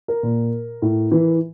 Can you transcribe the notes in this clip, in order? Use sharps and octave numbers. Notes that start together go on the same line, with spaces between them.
A#4
A#2
A2
E3